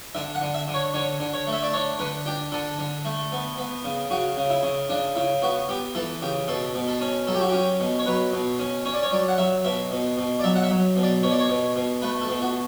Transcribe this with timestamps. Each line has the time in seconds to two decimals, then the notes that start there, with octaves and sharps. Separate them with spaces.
0.15 D3 E5
0.35 F#5
0.41 D3
0.54 E5
0.68 D3
0.74 C#5
0.94 D3 C#5
1.20 D3
1.34 C#5
1.47 A3
1.53 E5
1.63 D5
1.73 D4 C#5
1.99 D3 B4
2.26 D4 G4
2.52 D3 A4
2.78 D3
3.05 A3
3.32 B3
3.58 B3
3.84 C#3
4.10 C#3 F#4
4.37 C#3
4.50 E4
4.63 C#3
4.89 C#3 D4
5.15 C#3 E4
5.42 B3 F#4
5.69 B3 G4
5.95 E3 A4
6.21 C#3 G4
6.48 B2 A4
6.74 B2
6.88 A4
7.01 C#4
7.27 F#3 A4
7.34 G4
7.41 F#4
7.49 C#4 G4
7.80 B2
7.99 C#5
8.06 F#3 B4
8.33 B2
8.59 C#4
8.85 C#4 C#5
8.94 D5
9.03 C#5
9.12 F#3 D5
9.28 F#5
9.38 F#3 E5
9.65 B2 E5
9.91 B2
10.17 B2
10.40 D5
10.44 F#3 E5
10.55 F#5
10.64 E5
10.70 F#3
10.96 B2
11.03 D5
11.23 B2 C#5
11.31 D5
11.39 C#5
11.49 B2
11.76 B2
12.02 A3 B4
12.22 A4
12.28 B2
12.42 F#4